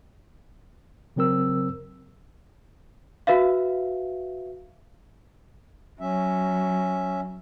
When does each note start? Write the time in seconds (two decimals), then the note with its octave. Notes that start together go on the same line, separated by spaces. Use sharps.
1.16 C#3 F#3 C4 A#4 E6
3.27 F#4 B4 E5 F5
6.00 F#3 C#4 E5